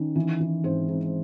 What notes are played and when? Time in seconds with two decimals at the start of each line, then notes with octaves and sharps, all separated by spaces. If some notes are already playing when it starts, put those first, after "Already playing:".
Already playing: D#3 C#4
0.16 E3
0.40 E3
0.64 G#2 C4 C5
0.88 G#2